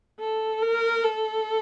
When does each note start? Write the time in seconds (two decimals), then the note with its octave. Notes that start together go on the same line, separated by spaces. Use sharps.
0.20 A4
0.62 A#4
1.04 A4